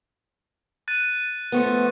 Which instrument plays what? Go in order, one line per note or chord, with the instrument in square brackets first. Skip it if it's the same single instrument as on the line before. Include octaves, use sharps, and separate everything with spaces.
[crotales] F#6 A6 D#7
[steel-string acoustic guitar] F3 A3 B3